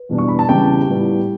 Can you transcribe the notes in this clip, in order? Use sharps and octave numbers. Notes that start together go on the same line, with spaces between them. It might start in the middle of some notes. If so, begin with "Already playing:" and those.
Already playing: B4
E2 B2 G3 B3 D4
C#6
B5
A5
E2 C#3 G3 C#4 G4 G5
A2 G3 B3